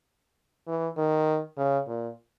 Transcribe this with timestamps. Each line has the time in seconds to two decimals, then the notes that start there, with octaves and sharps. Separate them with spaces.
0.67 E3
0.98 D#3
1.57 C#3
1.87 A#2